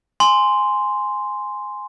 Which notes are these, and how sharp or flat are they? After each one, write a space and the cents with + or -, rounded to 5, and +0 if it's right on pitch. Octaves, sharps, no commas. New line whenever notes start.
G#5 +0 C6 -5